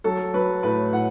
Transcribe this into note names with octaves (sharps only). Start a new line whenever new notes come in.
F#3 A4
F#3 B4
A2 B4
A2 F#5